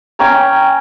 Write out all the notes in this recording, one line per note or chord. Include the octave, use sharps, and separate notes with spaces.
C#4 G5 A#5